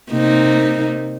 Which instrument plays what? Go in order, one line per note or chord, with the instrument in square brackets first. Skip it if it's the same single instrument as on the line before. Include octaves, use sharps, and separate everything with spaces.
[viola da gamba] C3 A#3 D#4